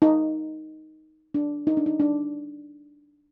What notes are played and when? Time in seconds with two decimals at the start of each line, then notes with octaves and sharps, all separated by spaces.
0.02 D#4
1.34 D4
1.67 D#4
1.77 D4
1.86 D#4
2.00 D4